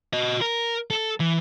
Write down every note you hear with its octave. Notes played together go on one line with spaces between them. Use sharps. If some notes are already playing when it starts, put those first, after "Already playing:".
F#4 D#5
A#4
A4
E3